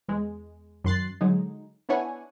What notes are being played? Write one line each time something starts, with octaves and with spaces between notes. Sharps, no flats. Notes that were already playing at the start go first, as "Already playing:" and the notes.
E2 G#3
F#2 D#3 C6 F#6 A6 C7
D3 F#3 G#3 D#4
B3 D4 E4 C#5 F#5 G#5